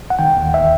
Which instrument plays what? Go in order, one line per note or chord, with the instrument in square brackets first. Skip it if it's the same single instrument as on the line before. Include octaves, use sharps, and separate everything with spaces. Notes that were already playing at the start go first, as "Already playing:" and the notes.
[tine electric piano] F#5
D#3 G5
D#2
E5